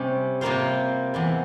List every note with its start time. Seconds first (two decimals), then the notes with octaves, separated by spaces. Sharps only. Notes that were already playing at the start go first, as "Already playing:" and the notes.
Already playing: C3 G3 C#4
0.41 C3 G3 A#3 F4 C5
1.14 E2 C3 E3 G3